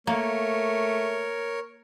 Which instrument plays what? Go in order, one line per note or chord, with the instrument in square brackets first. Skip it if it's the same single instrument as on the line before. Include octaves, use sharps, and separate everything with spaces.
[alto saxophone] A3 [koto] A#3 [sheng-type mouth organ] A#4 C#5